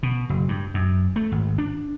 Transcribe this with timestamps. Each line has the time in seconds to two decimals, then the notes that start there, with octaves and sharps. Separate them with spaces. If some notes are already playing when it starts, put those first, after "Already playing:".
0.03 B2
0.29 F#1
0.48 G2
0.74 F#2
1.16 A3
1.32 G#1
1.58 D4